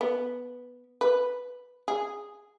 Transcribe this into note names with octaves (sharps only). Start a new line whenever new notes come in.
B3
B4
G#4